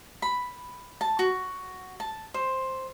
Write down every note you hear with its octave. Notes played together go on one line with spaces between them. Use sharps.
B5
A5
F#4
A5
C5